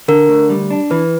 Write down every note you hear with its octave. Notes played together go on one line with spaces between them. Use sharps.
D3 A#4
D2
G3
D4
E3 B4